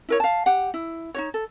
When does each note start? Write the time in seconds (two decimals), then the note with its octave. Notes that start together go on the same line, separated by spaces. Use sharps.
0.09 E4 A#4 C#5
0.20 F5 A5
0.46 G4 F#5
0.74 E4
1.14 D#4 F#4 C#5
1.34 A4